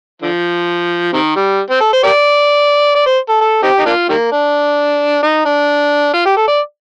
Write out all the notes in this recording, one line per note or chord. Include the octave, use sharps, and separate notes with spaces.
D3 F3
C3 D#3
G3
C4
A4
C5
G4 A#4 D5
D5
C5
A4
A4
C4 D#4 G4
D#4
A#3 D4 F4
D#3 G3 A#3
D4
D#4
D4
F4
G4
A4
D5